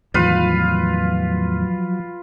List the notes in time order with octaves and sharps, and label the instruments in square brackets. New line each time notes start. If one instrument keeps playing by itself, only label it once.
[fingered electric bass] E2 A2 D#3 [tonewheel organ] F3 F#3 [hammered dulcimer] F4 B4 F5